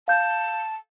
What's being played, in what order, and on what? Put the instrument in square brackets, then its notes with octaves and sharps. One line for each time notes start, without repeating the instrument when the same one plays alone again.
[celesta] F5 G6 [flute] A5